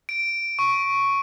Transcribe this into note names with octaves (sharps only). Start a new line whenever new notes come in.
D7
C#6